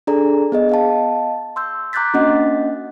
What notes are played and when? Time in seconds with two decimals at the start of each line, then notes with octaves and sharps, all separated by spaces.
0.07 D4 G#4 A4 D5 A#5
0.52 B3 G#4 D#5
0.69 D#5 F5 A5
1.56 C6 E6 G6
1.93 A#5 D6 F#6 G6 A6 B6
2.14 A#3 C#4 D4 F#4 D#5 F#5